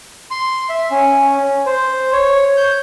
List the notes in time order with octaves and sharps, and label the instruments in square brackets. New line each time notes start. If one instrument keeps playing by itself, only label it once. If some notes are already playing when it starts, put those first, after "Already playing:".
[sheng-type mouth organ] C6
E5
C#4
C5
C#5
G6